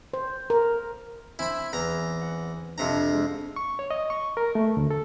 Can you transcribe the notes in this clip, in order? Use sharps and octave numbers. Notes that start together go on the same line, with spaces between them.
C5
A#4
C4 E4 G#5 B5
E2 A#5
F#5
F2 C3 D4 A#5
G#3 G4
C#6
C#5
D#5
C#6
A#4
A3
D2
A4